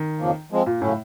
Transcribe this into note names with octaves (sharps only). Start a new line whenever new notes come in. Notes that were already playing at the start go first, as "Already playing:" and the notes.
Already playing: D#3
F2 C#3 F3 A#3
F3 G#3 C4
A#2
A2 C#3 F#3 A3 C#4